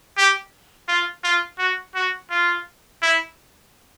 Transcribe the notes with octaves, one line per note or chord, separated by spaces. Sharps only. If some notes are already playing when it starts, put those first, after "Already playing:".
G4
F4
F4
F#4
F#4
F4
E4